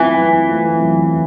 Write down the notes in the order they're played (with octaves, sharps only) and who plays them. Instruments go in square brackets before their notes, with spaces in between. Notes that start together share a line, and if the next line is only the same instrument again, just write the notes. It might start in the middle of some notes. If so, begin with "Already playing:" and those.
Already playing: [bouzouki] E3 [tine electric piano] F#3 A3 C4 F4
[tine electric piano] F#3
A3 C4 F4
F#3